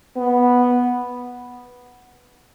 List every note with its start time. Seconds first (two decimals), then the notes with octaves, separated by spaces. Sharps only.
0.17 B3